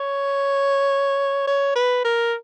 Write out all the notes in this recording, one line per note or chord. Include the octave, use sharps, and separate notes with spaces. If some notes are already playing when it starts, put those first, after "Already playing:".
Already playing: C#5
C#5
B4
A#4